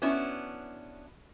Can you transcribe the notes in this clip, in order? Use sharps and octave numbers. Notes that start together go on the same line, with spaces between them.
B3 C#4 D4 E4 F#4